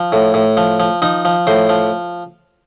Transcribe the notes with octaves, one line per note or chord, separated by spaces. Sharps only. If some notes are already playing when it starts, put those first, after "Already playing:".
Already playing: F3
A2
A2
F3
F3
F3 D#4
F3
A2 C5
F3